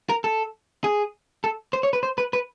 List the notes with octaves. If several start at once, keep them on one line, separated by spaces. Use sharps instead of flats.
A#4
A4
G#4
A4
C5
C#5
B4
C5
B4
B4